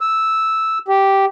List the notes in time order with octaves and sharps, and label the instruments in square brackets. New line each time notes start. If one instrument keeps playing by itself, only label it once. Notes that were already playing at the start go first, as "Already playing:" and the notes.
[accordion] E6
G4